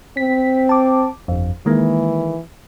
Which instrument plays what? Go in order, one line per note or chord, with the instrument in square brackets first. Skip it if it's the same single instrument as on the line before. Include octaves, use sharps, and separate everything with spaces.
[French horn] C4 [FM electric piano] B6
[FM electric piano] A5 D6
G1 F2
[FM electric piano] D#3 G#3 A#3 [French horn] E3